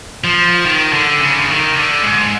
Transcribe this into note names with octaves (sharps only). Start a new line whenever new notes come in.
F3
D#3
D3
C#3
D3
D#3
D3
G#2